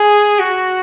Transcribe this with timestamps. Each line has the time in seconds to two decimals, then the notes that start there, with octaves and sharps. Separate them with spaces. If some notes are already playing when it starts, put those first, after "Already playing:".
Already playing: G#4
0.39 F#4